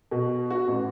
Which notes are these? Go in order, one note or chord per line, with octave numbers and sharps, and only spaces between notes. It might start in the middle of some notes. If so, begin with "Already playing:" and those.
B2
F#4
A1